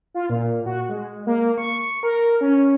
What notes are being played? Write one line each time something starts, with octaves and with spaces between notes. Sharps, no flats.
F4
A#2
F#4
G#3
A#3
C#6
A#4
C#4